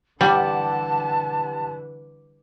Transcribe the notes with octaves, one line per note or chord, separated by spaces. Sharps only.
D3 E3 G3 G4 F#5 A5 D6